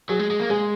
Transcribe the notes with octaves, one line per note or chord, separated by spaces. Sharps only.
F#3 G#4
G#3
G#3
A#3
G#3 G#4